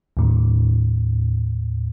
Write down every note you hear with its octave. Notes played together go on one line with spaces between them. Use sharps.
D#2 A2